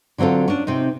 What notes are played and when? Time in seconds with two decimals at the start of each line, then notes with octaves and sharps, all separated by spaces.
0.18 D3 F#3 C4 F4 A4
0.48 C#4 D4
0.67 C3 C4 D#4